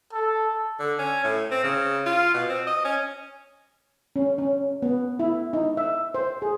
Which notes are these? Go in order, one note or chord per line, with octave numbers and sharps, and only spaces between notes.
A4
D3
C#4
A2
C4
C#3
F4
B2
C4
D#5
C#4
C#4
C#4
B3
E4
D#4
E5
C5
G#4